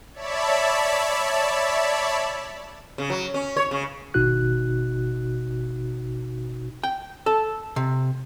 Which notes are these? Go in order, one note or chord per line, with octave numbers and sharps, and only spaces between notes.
C#5 D5 E5 A5 B5
C#3
F#3
C#4
C#5
C#3
G#1 B2 D#4 F#4 F#6
G5
A4
C3